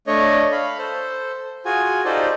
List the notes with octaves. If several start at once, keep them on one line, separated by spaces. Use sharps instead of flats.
A3 D4 C#5 D#5
F5 B5
A4 C5
F4 F#4 G#4 G#5
D#4 F4 G4 A4 C5 D5